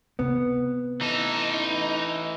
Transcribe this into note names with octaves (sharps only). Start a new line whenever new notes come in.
C3 B3
E3 D#4 A4